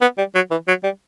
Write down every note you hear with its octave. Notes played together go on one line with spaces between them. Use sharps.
B3
G3
F#3
E3
F#3
G3